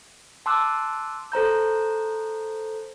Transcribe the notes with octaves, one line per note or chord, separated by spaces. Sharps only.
A5 C6 D6 E6 F#6
A4 C5 A#5 G6